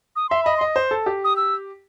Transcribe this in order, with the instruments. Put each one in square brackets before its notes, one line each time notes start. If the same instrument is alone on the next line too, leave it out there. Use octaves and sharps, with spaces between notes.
[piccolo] D#6
[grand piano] E5 [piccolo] C6
[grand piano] D#5 [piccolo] B5
[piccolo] C6
[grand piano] D#5
C5
A4
G4
[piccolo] D#6
E6